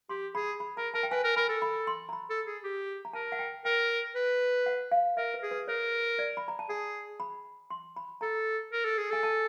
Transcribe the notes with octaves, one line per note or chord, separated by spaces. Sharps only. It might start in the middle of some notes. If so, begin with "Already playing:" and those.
G4 C6
G#4 B5
B5
A#4 A#5
A#4 A5
G5
B4 G#5
A#4
A#4 B5
A4
B5
C6
A#5
B5
A4
G#4
G4
A#5
A#4 A5
F#5
G5
A#4 G5
B4
F#5
F5
A#4 E5
B4
G#4
B4
A#4 C#5
D5
B5
A#5
A5
G#4 G#5
B5
C6
B5
A4 A#5
A#4
A4
G#4
A4 G#5
A5